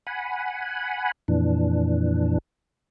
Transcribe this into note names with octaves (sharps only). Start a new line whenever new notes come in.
F#5 G#5 B5
F2 A#2 E3 D4